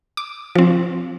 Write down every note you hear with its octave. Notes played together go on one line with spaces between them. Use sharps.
D6
F3 C4